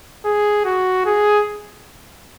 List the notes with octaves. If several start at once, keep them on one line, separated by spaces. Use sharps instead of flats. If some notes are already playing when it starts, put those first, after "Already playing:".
G#4
F#4
G#4